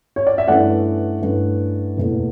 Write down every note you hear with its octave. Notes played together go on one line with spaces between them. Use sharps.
C#5
D5
E5
G2 E3 A3 C#4 D5 F#5
G2 E3 A3 C#4
F#1 E2 B2 A3